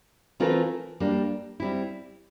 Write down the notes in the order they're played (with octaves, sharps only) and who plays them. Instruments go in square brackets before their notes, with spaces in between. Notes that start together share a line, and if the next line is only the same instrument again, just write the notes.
[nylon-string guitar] E3 A3 C4 F4 A#4
G3 A#3 D4
G3 C4 E4